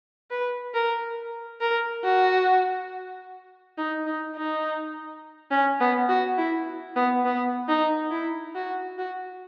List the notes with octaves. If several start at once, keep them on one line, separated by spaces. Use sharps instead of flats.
B4
A#4
A#4
F#4
D#4
D#4
D#4
C#4
B3
F#4
E4
B3
B3
D#4
E4
F#4
F#4